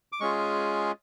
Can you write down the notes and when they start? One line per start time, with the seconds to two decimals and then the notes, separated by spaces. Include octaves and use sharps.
0.12 D6
0.20 G#3 C#4 F4 G#4 C#6